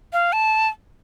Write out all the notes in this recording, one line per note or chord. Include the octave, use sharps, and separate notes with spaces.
F5
A5